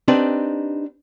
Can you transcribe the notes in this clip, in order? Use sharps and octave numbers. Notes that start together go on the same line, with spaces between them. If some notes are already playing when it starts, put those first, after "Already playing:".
C4 D4 D#4 G4 B4